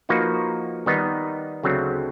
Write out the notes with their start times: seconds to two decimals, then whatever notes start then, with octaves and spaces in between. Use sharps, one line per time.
0.09 F3 A#3 D#4 F#4 B4
0.86 D#3 G3 B3 D#4
1.63 D2 C#3 F#3 A3 C4